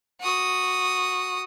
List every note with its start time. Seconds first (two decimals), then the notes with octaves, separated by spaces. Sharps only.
0.21 F#4 D#6